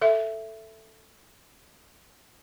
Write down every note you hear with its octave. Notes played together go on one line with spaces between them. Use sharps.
A4 E5